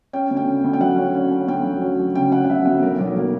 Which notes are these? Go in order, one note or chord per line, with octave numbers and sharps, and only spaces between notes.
C#4 G5
D2
G5
C#3
D2
G5
F#3 F#5
C#4
C#4
C#4
D2 G5
F#3
C#4
F#3
C#3 G5
C#3 F#5
F#5
F#3 E5
D2 F#5
B1 A#4
B1
A#3